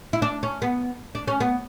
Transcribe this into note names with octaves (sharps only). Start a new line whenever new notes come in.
E4
D4
C#4
B3
D4
C#4
B3